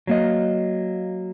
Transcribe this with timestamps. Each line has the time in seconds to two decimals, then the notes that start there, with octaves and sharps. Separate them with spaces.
0.07 F#3 A#3 D#5